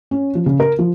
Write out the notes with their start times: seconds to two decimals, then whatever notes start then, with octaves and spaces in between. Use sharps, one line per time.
0.11 C#4
0.35 F3
0.46 C#3
0.60 A#4
0.79 F3